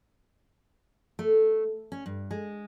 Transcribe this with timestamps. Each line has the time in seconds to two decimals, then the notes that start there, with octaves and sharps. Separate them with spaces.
1.19 A3
1.92 C#4
2.06 G2
2.31 G#3